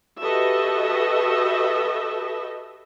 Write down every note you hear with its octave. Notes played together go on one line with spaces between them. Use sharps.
F#4 G4 A4 B4 D#5 E5